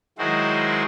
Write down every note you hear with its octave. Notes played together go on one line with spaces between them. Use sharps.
D#3 F#3 G#3 E4 F#4 C5